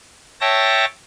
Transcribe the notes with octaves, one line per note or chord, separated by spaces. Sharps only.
C#5 E5 G5 A5 A#6